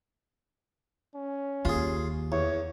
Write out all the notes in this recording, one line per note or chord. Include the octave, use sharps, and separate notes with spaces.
C#4
D#2 F4 G#4
E2 C#5